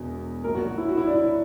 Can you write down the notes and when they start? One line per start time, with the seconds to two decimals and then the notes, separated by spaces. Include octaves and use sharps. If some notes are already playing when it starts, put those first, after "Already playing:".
Already playing: E1 E2 B2
0.43 A#1 A#2 F#3 A#4
0.55 F#4
0.67 F#4
0.78 E4
0.89 F#4
0.97 E4
1.06 D4
1.15 E4